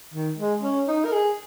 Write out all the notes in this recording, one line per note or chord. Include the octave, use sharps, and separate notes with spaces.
D#3
G#3
C#4
D#4
A#4
G#4